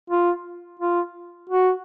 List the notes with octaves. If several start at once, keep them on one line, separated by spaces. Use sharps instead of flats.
F4
F4
F#4